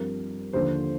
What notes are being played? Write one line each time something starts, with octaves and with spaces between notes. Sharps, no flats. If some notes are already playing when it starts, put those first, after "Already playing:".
Already playing: G2 F3 C4 A#4
D#2 D3 F3 C5